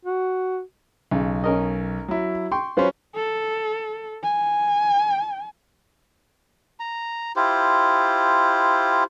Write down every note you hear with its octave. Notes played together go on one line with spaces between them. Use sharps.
F#4
B1 C#3
C#4 A#4 D#5
F#3 E4
G5 C6 C#6
F#3 C#4 F4 B4 C5
A4
G#5
A#5
E4 F4 G4 C5